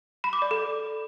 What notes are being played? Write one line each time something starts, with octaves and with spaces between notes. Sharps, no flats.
B5
D6
D5
A4